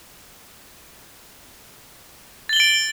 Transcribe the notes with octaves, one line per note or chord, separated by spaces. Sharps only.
A6 D7 F#7 G7